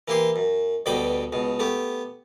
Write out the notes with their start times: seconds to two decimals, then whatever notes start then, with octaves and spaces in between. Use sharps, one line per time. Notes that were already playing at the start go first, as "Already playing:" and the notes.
0.08 E3 A#3 E4 G4 C6
0.36 F#2
0.86 D2 G2 B2 G5 B5 D6
1.32 C#2 B2
1.60 A3 B3 G4